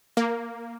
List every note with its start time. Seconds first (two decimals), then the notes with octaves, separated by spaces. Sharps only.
0.17 A#3